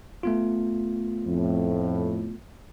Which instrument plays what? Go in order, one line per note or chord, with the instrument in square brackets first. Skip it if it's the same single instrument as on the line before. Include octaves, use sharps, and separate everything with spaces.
[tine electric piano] A3 B3 F4
[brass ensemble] F2 A2